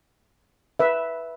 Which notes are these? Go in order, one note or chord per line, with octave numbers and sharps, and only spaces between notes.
B4 E5